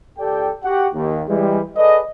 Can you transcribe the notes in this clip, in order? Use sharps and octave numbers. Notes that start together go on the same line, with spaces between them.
C#2 G4 A4 D5 G5
F#4 G4 F#5
D#2
E3 G3 G#3
G#4 A4 B4 D5 D#5